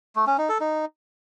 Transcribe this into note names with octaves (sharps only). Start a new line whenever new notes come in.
A3
C#4
D#4
A4
D#4